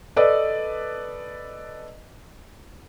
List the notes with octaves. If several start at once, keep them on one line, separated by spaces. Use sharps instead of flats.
A4 B4 D5 D#5